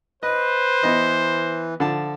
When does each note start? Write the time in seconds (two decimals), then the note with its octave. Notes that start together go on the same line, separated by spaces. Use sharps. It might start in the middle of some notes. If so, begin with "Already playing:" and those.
0.23 B4 C5 D#5
0.83 E3 B3 D#5
1.80 D3 F3 A5